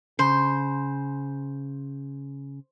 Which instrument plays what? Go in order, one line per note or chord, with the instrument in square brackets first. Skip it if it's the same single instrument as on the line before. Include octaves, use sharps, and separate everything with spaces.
[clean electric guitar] C#3 [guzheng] C5